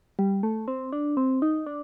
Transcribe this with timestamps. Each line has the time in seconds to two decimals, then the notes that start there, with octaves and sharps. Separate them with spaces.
0.19 G3
0.43 A3
0.68 C4
0.93 D4
1.17 C4
1.42 D#4
1.66 D4